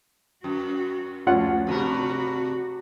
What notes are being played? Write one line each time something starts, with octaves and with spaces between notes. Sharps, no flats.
F#2 F#4
D2 F3 C#4 F4 F#5
G2 C3 F#4 A#4